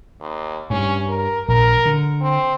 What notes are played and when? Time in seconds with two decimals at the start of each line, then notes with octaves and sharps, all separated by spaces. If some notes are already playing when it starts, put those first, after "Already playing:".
0.20 D#2
0.70 G2 C#4
1.08 A#4
1.48 A#1 A#4
1.86 D3
2.21 C4